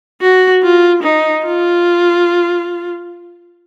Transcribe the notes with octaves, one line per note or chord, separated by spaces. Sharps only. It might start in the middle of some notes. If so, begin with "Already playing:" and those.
F#4
F4
D#4
F4